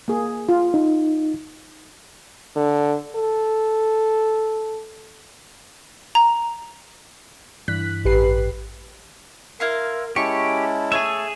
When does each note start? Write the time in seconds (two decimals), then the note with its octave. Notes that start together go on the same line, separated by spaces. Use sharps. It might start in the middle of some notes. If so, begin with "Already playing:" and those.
0.08 A#3 G#4
0.49 F4
0.74 D#4
2.56 D3
3.16 A4
6.15 A#5
7.68 G2 E3 F#6 B6
8.05 A1 G4 B4 C7
9.60 E4 A#4 F5 C6
10.16 G#3 C#4 E4 G4 A5 C#6
10.92 A3 G#4 C#5 E5